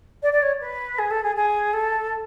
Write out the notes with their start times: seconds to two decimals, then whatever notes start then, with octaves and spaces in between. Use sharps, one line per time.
0.22 D5
0.32 D5
0.42 C#5
0.61 B4
0.98 G#4
1.10 A4
1.23 G#4
1.35 G#4
1.73 A4